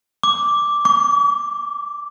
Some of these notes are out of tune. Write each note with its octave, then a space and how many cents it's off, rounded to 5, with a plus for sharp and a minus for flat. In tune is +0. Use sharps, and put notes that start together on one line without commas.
D6 -5
D6 -45